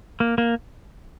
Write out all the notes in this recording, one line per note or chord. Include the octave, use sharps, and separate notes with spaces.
A#3
A#3